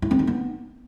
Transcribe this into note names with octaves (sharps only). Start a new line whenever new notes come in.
E4
C4
D#4
B3